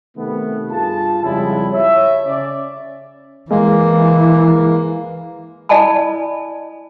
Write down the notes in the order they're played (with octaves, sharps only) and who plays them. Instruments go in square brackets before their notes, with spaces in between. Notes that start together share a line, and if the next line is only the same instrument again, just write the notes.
[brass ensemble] C3 D#3 A3 B3
G2 F4 G#4 A5
F2 C#3 G3 G#3 E4
C#5 E5
C#3 D5
[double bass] E3 [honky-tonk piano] G#3 [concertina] A#3
[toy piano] E4 D5 D#5 G#5 A5 B5